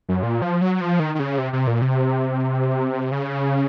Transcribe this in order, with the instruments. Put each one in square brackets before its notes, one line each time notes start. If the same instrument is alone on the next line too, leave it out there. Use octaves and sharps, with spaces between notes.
[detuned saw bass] F#2
A#2
F3
F#3
F3
D#3
D#3
C#3
C3
C3
A#2
C3
C#3